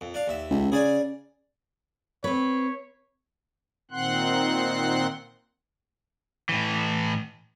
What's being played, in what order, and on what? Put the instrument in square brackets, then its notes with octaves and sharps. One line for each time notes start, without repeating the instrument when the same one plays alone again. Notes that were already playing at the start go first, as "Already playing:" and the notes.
[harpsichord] F2
D4 F5
D#2 E5
[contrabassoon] C#2
[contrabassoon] C#3 [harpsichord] G#4 D5 G#5
[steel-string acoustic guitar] C4 B4 [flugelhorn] C#5
[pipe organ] A#2 D#3 C4 F#5 C6 F#6
[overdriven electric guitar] A2 E3